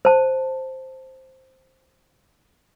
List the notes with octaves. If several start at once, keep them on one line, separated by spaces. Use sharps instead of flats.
C5 A5